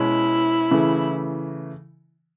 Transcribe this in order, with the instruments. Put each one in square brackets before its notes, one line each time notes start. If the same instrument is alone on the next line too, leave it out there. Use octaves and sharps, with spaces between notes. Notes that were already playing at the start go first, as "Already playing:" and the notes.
Already playing: [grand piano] B2 G#3 C#4 [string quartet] E4
[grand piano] C#3 E3 A3